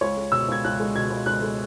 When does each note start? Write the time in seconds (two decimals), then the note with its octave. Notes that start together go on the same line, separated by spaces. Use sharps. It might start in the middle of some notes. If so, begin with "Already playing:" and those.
0.01 C#2 C#5
0.17 G#3
0.32 B2 E6
0.49 C#2 G#6
0.64 C#2 F#6
0.80 G#3
0.95 B2 G#6
1.10 C#2
1.26 C#2 F#6
1.42 G#3